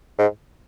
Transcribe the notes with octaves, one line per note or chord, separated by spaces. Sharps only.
G#2